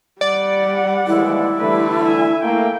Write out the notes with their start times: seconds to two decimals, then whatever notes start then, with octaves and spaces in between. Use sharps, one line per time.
0.21 G3 D5 F#5
1.07 D#2 E3 G#3 E4
1.59 D3 E3 G3 A3 B4
2.05 E5 G#5
2.42 A3 A#3 G5